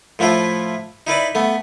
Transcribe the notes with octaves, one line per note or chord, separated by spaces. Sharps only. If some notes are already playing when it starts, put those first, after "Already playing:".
A2 F3 A3 E4 F4
D#4 E4 B4 D5
A3 B3